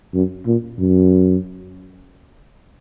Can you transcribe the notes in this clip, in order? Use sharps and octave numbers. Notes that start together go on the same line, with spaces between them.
F#2
A#2
F#2